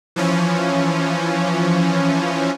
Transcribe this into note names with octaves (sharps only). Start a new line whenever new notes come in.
E3 F3 C#4